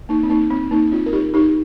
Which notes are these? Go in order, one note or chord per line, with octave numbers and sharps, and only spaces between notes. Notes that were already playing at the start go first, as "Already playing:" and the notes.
A#3 D#4
C4
A#3 D#4
C4
A#3 D#4
C4 F4
A#4
D#4 G4
D#4 G4